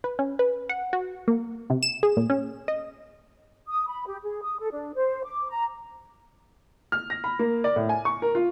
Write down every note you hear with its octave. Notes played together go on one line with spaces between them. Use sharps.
B4
C#4
B4
F#5
F#4
A#3
C3
E7
G#4
A#2
C#4
D#5
D#6
B5
G4
G#4
D#6
A4
D4
C5
D6
A#5
F6
A#6
B5
A#3
D5
A2
G#5
C#6
A#4
F4